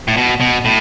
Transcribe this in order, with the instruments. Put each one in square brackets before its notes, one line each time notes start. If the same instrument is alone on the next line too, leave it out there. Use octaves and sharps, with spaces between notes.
[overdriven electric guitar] A2
B2
B2
A2